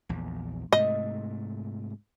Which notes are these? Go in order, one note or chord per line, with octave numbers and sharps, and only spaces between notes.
A#1 E2
G#2 C3 A3 D#5